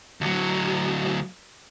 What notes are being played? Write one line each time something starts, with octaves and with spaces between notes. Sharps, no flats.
D2 F#3